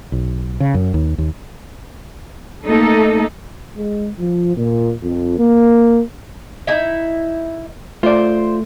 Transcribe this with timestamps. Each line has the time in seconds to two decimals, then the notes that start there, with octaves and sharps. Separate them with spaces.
0.12 B1
0.60 C#3
0.74 F#2
0.94 D#2
1.18 D#2
2.65 A3 A#3 D#4 A4
3.76 G#3
4.19 F3
4.56 A#2
5.04 F2
5.38 A#3
6.67 D#4 E4 E5
8.03 A3 F4 C5 D5